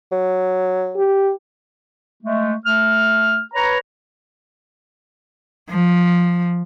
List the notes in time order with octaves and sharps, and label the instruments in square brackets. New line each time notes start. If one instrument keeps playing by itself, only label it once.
[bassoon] F#3
[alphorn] G4
[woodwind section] G#3 A3
A3 F6
B4 C#5 A#5
[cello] F3